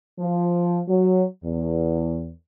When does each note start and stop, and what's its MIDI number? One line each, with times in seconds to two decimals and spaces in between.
0.19 0.80 53
0.88 1.23 54
1.44 2.32 40